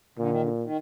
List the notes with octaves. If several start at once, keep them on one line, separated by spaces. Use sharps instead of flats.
A#2 D3
D#3
D3
D#3